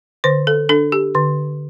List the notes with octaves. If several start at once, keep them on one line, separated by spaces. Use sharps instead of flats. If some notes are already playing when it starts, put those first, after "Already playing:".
D3 C5
A4
D4 A4
G4
D3